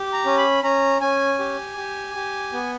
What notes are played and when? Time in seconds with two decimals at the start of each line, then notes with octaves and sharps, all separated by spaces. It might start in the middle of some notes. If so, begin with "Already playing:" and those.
Already playing: G4
0.13 A#5
0.25 C#4
0.38 B5
0.63 C#4 A#5
1.01 C#4 G#5
1.39 G4
1.77 G4
2.15 G4
2.53 B3